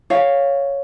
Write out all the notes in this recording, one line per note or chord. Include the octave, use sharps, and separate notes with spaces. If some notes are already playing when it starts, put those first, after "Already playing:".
C#5 F5